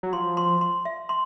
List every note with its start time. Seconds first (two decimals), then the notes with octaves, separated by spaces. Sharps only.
0.03 F#3
0.13 F3 C6
0.37 C6
0.61 C6
0.85 E5
1.09 C6